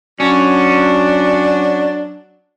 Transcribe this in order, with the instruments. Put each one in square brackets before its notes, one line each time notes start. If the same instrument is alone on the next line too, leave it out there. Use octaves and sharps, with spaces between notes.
[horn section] F#3 [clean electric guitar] C#4 [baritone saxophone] D4